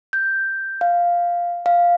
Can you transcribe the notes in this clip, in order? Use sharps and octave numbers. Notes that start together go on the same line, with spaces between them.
G6
F5
F5